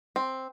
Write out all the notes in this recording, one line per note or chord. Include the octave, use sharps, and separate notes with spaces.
C4